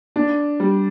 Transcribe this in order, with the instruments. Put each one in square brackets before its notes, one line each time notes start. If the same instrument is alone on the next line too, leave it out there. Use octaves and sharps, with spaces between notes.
[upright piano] D4
G3